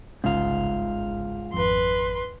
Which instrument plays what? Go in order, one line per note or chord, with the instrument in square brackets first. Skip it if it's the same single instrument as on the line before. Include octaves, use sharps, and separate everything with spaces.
[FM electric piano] G1 C2 C#3 [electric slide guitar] G#2 F4
[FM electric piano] G#1 F2 [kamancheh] B4 C6